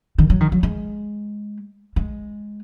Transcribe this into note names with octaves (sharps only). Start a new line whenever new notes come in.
D#3
F#3
D#3
F#3
G#3
G#3